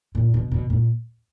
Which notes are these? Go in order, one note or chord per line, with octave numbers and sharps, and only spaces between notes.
A#2
B2
B2
A#2